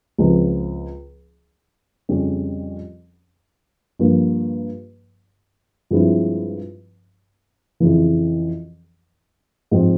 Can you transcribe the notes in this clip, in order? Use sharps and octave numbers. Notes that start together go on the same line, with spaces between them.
C#2 C#3 F3 C4
F2 C#3 G3 C#4
G2 F3 A#3
G2 F3 G#3 C4 E4
F2 C#3 E3
G#2 F3 C4